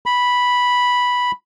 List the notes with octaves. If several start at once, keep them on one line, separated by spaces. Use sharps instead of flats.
B5